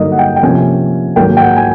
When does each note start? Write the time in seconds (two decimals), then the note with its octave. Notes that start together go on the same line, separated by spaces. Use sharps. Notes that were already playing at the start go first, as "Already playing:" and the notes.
Already playing: G2 D3 F#3 A#3 D#4 D#5
0.12 F#5
0.19 G5
0.36 G5
0.43 C3 F3 A#3 C#4 G#5
1.16 G#2 D#3 F#3 A#3 G5
1.37 G5
1.41 F#5
1.56 G#5